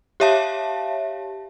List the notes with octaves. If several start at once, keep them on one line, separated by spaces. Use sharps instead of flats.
G4 C#5 E5 F5 A5